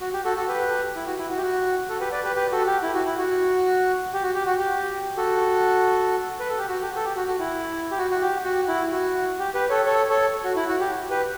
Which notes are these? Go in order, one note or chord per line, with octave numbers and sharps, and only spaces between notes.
F#4
G4
F#4 A4
F#4 A4
G4 B4
E4
F#4
E4
F#4
G4
F#4
F#4 A4
G4 B4
B4 D5
G4 B4
G4 B4
F#4 A4
G4
E4
F#4
E4
F#4
G4
F#4
G4
F#4
G4
F#4 A4
B4
A4
G4
F#4
G4
A4
G4
F#4
F#4
E4
G4
F#4
F#4
G4
F#4
E4
F#4
G4
G4 B4
A4 C#5
A4 C#5
A4 C#5
F#4
E4
F#4
G4
G4 B4